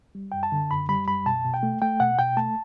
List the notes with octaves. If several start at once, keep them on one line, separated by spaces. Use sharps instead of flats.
G3
F#2 G5
A5
D3
F#2 B5
G3 B5
F#2 B5
B2 A5
B2
G5
A3
A3 G5
B2 F#5
B2 G5
A3 A5